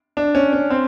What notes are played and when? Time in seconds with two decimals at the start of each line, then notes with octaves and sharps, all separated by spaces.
0.17 D4
0.35 C#4
0.53 C#4
0.70 C4